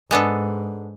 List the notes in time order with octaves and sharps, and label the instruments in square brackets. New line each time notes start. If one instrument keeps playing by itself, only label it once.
[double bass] G#2 [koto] G#3 B3 D4 A4